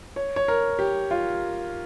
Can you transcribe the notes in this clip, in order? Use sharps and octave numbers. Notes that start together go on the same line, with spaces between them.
C#5
C#5
A#4
G4
F4